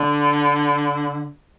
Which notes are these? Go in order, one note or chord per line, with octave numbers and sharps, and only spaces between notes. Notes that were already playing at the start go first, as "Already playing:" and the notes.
Already playing: D3